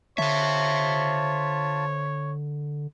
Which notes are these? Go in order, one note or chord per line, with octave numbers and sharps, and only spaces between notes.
D3 F4 C5 C#5 E5 A5